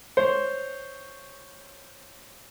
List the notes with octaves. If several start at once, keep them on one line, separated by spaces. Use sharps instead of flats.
C5 C#5